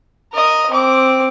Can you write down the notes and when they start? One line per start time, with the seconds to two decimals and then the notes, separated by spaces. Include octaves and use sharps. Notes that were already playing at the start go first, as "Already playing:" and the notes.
0.34 A#4 D#5
0.70 C4 D6